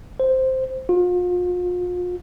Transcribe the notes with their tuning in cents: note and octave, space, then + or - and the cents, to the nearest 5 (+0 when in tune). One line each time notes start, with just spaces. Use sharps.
C5 +0
F4 +40